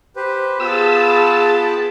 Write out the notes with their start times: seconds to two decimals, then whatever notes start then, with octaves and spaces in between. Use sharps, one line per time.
0.16 G4 B4 C5
0.60 B3 F4 G#4 G5 A5 B5 E6